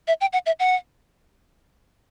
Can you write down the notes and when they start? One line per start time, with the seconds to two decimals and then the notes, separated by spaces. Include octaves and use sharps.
0.08 E5
0.21 G5
0.33 F#5
0.46 E5
0.60 F#5